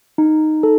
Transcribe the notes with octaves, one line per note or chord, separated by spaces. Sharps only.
D#4
A4